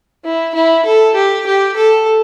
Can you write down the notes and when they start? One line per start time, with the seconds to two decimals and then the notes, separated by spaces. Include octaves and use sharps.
0.24 E4
0.55 E4
0.85 A4
1.15 G4
1.46 G4
1.76 A4